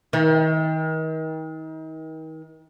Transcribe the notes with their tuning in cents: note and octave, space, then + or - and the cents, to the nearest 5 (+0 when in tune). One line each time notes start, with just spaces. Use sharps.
D#3 +35